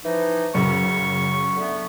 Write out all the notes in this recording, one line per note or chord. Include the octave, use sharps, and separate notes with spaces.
E3 F3 D#4
F#2 C#3 C#6
D3 A3 B3